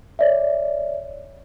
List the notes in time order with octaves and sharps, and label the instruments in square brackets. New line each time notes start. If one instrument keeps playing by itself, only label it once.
[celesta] C#5 D5 E5